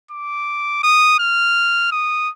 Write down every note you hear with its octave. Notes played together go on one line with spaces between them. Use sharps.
D6
D#6
F6
D#6